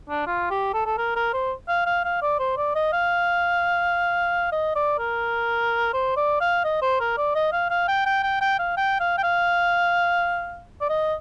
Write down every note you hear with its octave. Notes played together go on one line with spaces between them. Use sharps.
D4
F4
G4
A4
A4
A#4
A#4
C5
F5
F5
F5
D5
C5
D5
D#5
F5
D#5
D5
A#4
C5
D5
F5
D#5
C5
A#4
D5
D#5
F5
F5
G5
G5
G5
G5
F5
G5
F5
G5
F5
D5
D#5